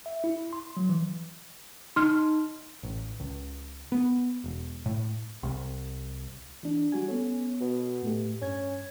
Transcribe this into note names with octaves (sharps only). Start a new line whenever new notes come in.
E5
E4
C6
F#3
E3
D#4 C6 F6
A1
C#2
B3
E1
A2
C2
E3 D4
G3 F#4 G#5
B3 C#4 A4
B2
A2 A3 G4
G2 C#4 G#6